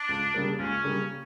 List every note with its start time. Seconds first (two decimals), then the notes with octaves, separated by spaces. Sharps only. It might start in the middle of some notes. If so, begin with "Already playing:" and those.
Already playing: D4
0.09 C#2
0.34 C#3 G3 A#3
0.59 C#2 C#4
0.84 C#3 G3 A#3